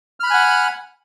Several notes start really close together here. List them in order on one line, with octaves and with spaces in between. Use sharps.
F6 B5 F#6 G#5 F#5